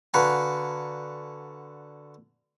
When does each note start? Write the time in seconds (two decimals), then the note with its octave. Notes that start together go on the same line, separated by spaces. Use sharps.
0.14 D3 F#4 B4 F5 G#5 A#5